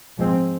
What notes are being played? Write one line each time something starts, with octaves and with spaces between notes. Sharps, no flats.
G#2 F3 G#3 C4